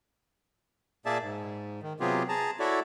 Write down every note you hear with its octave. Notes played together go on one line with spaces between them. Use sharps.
A#2 A#3 G#4 D5 E5 A5
G#2
D#3
C3 F#3 B3 F4 G4 G#4
G#4 A5 A#5
E4 F#4 A4 C#5 D5 E5